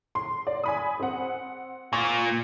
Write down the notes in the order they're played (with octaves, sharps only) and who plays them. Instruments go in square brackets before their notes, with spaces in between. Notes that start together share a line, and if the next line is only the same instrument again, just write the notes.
[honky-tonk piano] C6
D5
G#5 B5 D#6
C4 F#5
[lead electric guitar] A#2 [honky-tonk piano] C#6